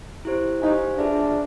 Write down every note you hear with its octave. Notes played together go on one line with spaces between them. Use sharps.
E4 G4 C5
D#4 G4 C5 F5 G#5
D4 F4 G#4 B4 E5